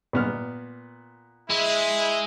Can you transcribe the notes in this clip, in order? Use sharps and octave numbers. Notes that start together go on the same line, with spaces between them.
A#2 B3 F6
G#3 E4